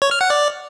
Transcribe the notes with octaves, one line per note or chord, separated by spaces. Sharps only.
C#5
F6
F#5
D5